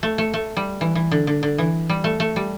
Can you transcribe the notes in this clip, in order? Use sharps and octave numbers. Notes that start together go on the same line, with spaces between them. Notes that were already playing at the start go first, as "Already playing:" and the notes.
A3
A3
A3
G3
E3
E3
D3
D3
D3
E3
G3
A3
A3
G3